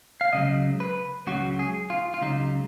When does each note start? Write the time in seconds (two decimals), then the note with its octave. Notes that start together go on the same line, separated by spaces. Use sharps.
0.21 F5
0.33 C#2 C#3 F#3 D#5
0.80 B4
1.27 C#2 C#3 F#3 F#4
1.59 G#4
1.90 F4
2.14 F4
2.21 C#2 C#3 F#3 D#4